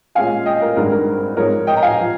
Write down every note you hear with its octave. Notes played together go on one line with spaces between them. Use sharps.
A#2 G#3 C#4 F4 F5 G#5
D#5 G5
A#4
G#1 G2 D#3 G#3 C4 A#4
A#4
G#2 F3 G#3 D#4 A#4 C#5
D#5 G5
A#5
F5 G#5
F3